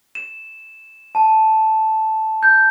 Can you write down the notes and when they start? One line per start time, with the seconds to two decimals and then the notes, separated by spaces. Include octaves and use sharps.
0.15 E7
1.15 A5
2.43 G6